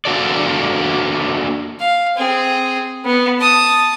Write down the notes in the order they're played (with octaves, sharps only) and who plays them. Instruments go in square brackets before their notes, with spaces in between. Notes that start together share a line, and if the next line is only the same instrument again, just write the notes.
[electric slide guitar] A#3 D4 F#4 A4 D5
[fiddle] F5
C4 G#4
B3
A5 D#6